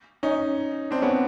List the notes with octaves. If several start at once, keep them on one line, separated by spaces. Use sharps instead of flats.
C#4 D#4
C4 D4
B3 C#4